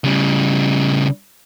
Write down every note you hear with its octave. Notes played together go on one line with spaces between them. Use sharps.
C#3 G3